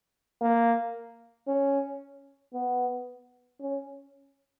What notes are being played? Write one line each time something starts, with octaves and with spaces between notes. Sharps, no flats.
A#3
C#4
B3
C#4